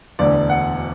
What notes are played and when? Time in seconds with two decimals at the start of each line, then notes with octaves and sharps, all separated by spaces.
0.19 E1 D2 D3 D5
0.50 F#5